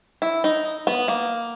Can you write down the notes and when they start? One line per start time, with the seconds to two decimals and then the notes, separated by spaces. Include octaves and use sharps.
0.22 E4
0.44 D#4
0.87 B3
1.08 A#3